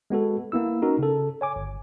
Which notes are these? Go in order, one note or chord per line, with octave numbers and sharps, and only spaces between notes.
G#3 B3 F#4 A4
A#3 B3 E4 E6
C#4 D#4 F#4 A#4
C#3 A4
C#5 G#5 D6
G1